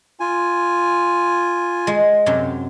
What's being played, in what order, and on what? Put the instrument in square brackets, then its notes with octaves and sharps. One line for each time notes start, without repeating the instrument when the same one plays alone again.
[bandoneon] F4 G#5
[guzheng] G#3
F#2 C3 F#3